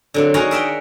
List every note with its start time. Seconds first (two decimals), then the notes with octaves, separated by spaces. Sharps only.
0.14 D3 F#3 C4
0.34 D#3 F#4 G#4 C#5 F5 A#5
0.51 A#4 E5 F#5 G5